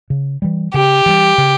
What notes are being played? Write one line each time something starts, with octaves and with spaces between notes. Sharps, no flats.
C#3
E3 G3
C#3 G4
E3 G3
C#3